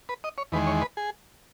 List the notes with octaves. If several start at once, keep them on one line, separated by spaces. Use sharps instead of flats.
B4
D#5
C#5
E2 D#3 G#3 B4
C#5
B4
G#4